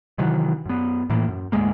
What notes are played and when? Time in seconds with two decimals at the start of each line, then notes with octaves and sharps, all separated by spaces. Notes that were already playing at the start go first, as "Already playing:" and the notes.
0.18 C3 D#3 E3 F#3
0.66 F#2 B3
1.10 A2 E3 A#3
1.29 F#2
1.52 D2 G#2 G#3 A#3